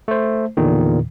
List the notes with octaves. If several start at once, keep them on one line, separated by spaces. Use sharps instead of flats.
A3 C5
E2 A#2 D3 D#3